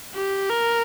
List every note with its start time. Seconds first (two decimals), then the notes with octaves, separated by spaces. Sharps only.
0.15 G4
0.50 A#4